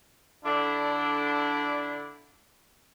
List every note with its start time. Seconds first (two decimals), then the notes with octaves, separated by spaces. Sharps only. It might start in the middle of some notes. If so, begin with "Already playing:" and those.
0.44 D3 D4 E4